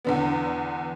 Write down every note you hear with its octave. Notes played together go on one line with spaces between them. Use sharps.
E2 D3 B3